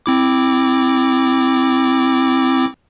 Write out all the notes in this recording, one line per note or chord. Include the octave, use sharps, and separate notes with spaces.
C4 E4 D6